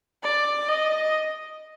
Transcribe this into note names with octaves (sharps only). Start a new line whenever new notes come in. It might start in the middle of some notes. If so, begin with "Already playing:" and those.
D5
D#5